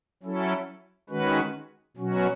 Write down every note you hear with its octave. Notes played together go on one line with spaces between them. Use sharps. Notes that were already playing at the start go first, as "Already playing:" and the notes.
F#3 C#4 E4 A4
D#3 G#3 C#4 F#4 B4
B2 F#3 C#4 F#4